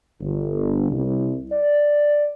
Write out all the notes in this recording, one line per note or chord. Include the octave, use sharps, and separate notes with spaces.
G1
C2
D5